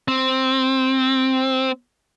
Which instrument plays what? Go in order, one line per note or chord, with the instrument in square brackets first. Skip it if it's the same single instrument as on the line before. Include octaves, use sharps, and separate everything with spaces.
[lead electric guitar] C4